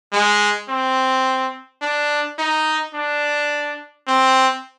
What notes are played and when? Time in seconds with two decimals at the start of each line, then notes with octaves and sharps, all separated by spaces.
0.13 G#3
0.69 C4
1.82 D4
2.39 D#4
2.94 D4
4.07 C4